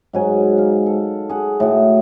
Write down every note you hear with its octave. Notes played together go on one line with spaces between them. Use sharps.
G#2 F#3 G#5
F5
A4
G#4 F#5
A2 D#4 F#4